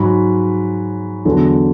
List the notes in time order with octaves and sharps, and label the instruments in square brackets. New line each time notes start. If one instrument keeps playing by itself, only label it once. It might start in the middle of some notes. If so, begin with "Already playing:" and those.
Already playing: [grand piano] G#2 F#3 B5
E2 D3 F#3